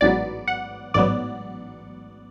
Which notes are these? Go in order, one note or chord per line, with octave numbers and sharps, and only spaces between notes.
A1 G#2 F#3 B3 D5
F#5
A1 G#2 F#3 B3 D5